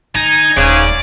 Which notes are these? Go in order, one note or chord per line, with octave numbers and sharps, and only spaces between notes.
D3 D#4 G#5
D#1 G#2 C#3 D5